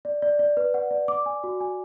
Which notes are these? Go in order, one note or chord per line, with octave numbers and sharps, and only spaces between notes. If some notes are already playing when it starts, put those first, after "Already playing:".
D5
D5
D5
B4
F#5
D5
D6
G#5
F#4
G#5